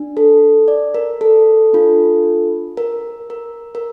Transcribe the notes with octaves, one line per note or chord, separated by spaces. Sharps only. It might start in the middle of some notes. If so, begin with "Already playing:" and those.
Already playing: D4
A4
D5
A#4
A4
D4 F4 A4
A#4
A#4
A#4